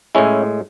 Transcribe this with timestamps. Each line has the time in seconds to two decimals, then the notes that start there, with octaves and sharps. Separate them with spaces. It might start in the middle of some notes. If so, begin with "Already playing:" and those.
0.15 A2 G#3 C#4 E4